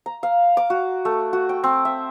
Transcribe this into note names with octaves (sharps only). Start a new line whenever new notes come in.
A#5
F5
D6
F#4
A3
F#4
G5
C4
E5